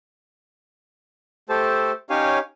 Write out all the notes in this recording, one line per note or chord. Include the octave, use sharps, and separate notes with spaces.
A3 G4 A4 C5 A5
C#4 D#4 G4 C#5 F5 G#5